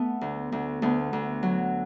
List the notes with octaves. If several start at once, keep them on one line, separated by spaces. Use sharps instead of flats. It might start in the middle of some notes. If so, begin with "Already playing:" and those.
Already playing: A3 B3
D2
D2
D2 B3
D2
F#3